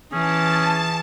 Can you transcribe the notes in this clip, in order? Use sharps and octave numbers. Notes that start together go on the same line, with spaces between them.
E3 C#4 G#4 A5